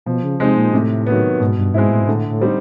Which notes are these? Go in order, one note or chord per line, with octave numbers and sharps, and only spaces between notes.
B2 F3
C#3
C3 G#3 C4 D#4
A#2
A2 C3
D#3 F#3 B3
G#2 B2
G2
G#2 G#3 C4 E4
A2
G#2
A2 D3
A2
G3 C4 D#4